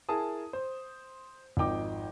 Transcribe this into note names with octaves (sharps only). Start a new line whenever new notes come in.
E4 G#4 A#4 A5 D#6
C5
G#1 F2 D#4 G5 D6